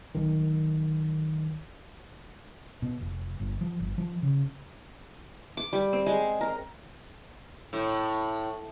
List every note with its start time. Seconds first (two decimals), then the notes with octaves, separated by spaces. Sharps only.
0.15 B1 D#3
2.82 B2
3.01 F1
3.39 G1
3.61 F3
3.80 G1
3.98 F3
4.23 C#3
5.57 D6
5.73 G3
5.93 C4
6.06 G#3
6.41 A#4
7.73 A2